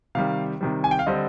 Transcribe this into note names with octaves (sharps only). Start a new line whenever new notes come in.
C3 D#3 G3 F5
C3 D#3 G3
G#5
G5
F5
D3 G3 C4 D#5